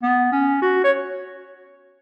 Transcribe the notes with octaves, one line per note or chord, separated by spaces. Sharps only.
B3
C#4
F#4
C#5